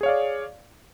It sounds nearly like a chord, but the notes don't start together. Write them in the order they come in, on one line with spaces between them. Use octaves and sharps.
G#4 C#5 F5 D5